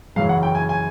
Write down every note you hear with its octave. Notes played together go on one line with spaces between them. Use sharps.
F#1 F#2 C#3 E3 F5
F#5
G5
G#5
G#5